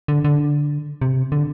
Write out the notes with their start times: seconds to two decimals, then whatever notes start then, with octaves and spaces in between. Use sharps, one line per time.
0.08 D3
0.24 D3
1.02 C3
1.32 D3